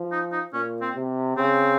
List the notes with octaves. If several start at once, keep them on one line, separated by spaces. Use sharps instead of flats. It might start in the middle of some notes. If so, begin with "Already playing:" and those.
Already playing: F3
D#4
D#4
A#2 C#4
C4
C3
C#3 C4